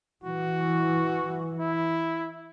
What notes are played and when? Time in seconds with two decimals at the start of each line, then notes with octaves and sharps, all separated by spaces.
0.24 E3 F#4
1.59 E4